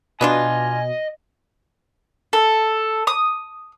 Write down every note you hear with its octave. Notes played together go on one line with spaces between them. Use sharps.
B2 B3 D4 F4 D#5 G#5
A4
D#6